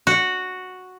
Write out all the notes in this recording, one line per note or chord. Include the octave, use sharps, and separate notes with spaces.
F#4